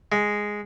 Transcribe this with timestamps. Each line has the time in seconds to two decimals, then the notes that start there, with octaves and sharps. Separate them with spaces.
0.12 G#3